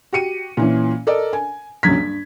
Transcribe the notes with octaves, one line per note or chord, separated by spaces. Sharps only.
F#4 G4 C#7 D#7
A#2 E3 C#4
A4 A#4 D5 D#5
G#5
D#1 C#2 D3 F#3 G#6 B6
G2